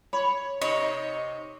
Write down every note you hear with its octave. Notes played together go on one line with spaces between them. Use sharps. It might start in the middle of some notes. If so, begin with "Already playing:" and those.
C#5 B5
C3 D#4 C#5 D#5